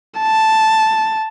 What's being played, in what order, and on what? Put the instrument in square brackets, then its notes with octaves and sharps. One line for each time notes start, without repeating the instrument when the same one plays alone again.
[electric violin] A5